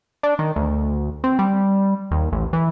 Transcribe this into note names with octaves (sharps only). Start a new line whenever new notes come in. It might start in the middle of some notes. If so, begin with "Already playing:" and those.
D4
D#3
D2
C4
G3
D#2
A1
E3